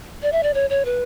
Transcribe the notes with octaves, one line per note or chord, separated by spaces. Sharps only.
D5
E5
D5
C#5
C#5
B4